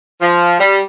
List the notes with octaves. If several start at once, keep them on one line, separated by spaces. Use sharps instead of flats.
F3
G3